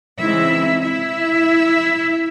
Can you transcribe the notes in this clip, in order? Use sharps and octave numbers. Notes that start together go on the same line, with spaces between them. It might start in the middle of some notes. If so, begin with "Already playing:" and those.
C#3 E3 G#3 C4 D#4 E4 E5
E4 E5